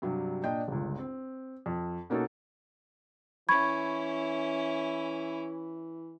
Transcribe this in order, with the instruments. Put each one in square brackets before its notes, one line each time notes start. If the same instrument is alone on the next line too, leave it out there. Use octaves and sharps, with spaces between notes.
[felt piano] G2 C3 F#3 G3
A#2 D4 D#5 G5
G1 C#2
C4
F2
B2 A#3 C#4 D#4 F#4 A4
[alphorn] E3 [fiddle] C#4 E4 [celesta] B5 C#6 G#6